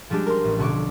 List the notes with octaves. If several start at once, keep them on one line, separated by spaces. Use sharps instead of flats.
F3 G3 G#3 D4 G4
A#4 C6
A1
B1 D3 F#4 C#6 D6